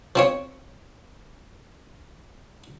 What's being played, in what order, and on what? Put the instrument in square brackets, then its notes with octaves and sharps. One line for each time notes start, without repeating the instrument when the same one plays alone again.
[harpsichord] F3 C4 C#5